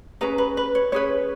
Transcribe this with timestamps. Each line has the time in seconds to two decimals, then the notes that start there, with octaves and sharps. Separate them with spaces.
0.21 C#4 G#4 B4 A#5
0.38 B4
0.57 B4
0.75 C#5
0.92 C#4 G#4 B4 C#5